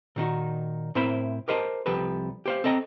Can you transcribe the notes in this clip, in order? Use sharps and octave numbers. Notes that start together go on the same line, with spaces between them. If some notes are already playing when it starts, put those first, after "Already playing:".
A#2 D#3 D#4 F#4
A2 C4 E4 A#4 C5 B5
G4 A#4 C5 D#5 A5
C2 F3 G4 A4 B4
G4 C5 F5
C4 A4 D#5 G5 A#5